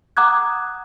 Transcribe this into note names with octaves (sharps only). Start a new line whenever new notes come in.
F#5 A#5 D6 D#6 F#6 G#6